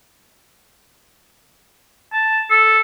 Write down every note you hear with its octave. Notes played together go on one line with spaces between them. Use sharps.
A5
A4